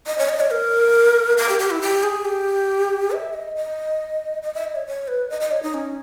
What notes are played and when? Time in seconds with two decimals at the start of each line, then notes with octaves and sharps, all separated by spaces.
0.06 D#5
0.18 C#5
0.29 D#5
0.40 C#5
0.51 A#4
1.38 A#4
1.49 G4
1.59 G4
1.71 E4
1.81 G4
2.03 G#4
2.25 G4
3.12 E5
3.34 D#5
3.56 D#5
4.42 D#5
4.54 E5
4.64 D#5
4.75 C#5
4.87 C#5
5.08 B4
5.30 D#5
5.41 D#5
5.51 C#5
5.63 D#4
5.74 C#4